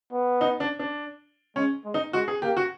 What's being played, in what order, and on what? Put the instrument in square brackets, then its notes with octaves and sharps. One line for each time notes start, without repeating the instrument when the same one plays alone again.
[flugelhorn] B3
[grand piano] D#4
D4
D4
[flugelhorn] G#3 [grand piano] C#4
[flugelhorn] G#3
[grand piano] D#4
[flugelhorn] G#3 [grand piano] F#4
[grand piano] G#4
[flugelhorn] A#3 [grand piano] G4
[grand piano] F#4